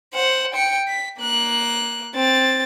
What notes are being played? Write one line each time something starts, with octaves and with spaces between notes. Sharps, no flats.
C5 F#5
G5 C#7
B6
A#3 F#6
C4 A6